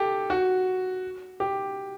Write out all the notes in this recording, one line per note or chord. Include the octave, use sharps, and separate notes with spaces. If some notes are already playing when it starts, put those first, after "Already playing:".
Already playing: G4 A4
F#4
G4